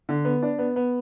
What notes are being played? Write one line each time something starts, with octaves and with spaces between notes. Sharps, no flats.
D3
B3
D4
B3
B3